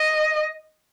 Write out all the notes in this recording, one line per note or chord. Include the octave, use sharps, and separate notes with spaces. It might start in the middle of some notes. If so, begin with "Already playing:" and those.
Already playing: D#5